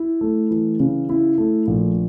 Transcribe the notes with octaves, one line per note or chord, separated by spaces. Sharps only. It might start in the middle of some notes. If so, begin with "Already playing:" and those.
Already playing: E4
A3
E3
C#3
E4
A3
A#1